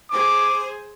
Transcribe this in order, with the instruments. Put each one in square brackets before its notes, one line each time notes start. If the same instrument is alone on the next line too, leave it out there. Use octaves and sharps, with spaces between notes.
[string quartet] G#4 C5 G#5 [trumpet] D6